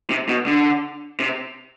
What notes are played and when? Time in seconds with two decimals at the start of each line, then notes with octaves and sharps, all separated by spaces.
0.10 C3
0.29 B2
0.46 D3
1.20 C3